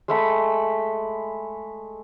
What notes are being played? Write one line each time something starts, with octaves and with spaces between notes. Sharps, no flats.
G#3 A3 B5